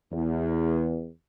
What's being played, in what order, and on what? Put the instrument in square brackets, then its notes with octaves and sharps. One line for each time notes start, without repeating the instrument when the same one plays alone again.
[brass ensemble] E2